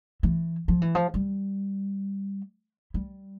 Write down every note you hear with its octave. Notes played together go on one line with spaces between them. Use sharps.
E3
F3
E3
F3
G3
G3